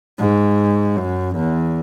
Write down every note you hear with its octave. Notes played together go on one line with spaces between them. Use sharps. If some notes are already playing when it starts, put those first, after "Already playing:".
G#2
F#2
E2